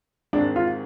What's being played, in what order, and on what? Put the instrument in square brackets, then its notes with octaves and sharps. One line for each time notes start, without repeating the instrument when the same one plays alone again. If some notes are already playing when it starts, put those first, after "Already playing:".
[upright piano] G#1 G#2 D#3 G#3 C4 [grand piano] D4
[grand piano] F4